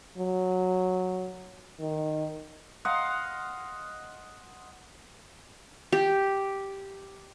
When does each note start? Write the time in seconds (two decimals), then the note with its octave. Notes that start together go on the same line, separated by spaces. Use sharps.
0.18 F#3
1.80 D#3
2.85 D#5 F5 F#5 C6
5.92 G4